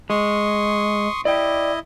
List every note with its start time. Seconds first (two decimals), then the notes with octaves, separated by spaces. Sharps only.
0.10 G#3 C6 C#6 D#6
1.25 E4 D5 D#5 G5